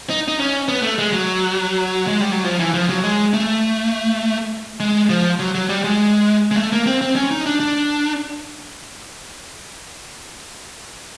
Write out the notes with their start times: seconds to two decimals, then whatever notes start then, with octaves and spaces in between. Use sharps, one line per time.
0.10 D#4
0.28 D#4
0.39 C#4
0.68 B3
0.83 A3
0.98 G#3
1.12 F#3
2.07 G#3
2.21 G3
2.32 F#3
2.45 F3
2.59 E3
2.74 F3
2.89 F#3
3.04 G#3
3.34 A3
4.80 G#3
5.09 F3
5.39 F#3
5.55 F#3
5.69 G3
5.84 G#3
6.51 G#3
6.57 A3
6.72 A#3
6.87 C4
7.01 C4
7.16 C#4
7.31 D#4
7.46 D4
7.60 D4